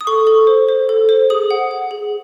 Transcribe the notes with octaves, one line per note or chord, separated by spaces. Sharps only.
D#6
A4 C#6
A4
C5
C5
A4
C5
G#4 D#6
F#5
F#5
G#4